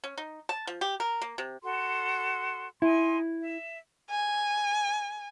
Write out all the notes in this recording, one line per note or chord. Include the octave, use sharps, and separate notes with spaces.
C#4
D#4
A5
F3
G4
A#4
A#3
C3
F#4 A4 C6
D#4 E4 G#5 C6
E5
G#5